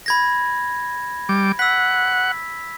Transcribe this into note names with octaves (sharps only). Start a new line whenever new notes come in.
B5 G#6 A#6
G3 D6
F#5 E6 B6